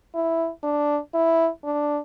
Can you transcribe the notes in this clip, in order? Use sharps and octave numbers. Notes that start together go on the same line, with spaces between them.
E4
D4
E4
D4